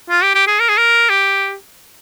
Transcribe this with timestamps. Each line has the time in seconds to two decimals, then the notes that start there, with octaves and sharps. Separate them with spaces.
0.10 F4
0.23 G4
0.35 G4
0.47 G#4
0.60 A#4
0.69 G#4
0.77 A#4
1.10 G4